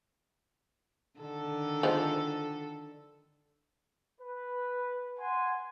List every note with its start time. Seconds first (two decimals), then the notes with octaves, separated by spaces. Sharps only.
1.19 D3 D#3 A4
1.83 F3 G#3 C5
4.21 B4
5.18 F#5 G#5 C6